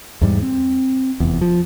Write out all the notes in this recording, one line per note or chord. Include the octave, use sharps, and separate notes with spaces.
E2 G#2 G3
C4
F1 E2
F3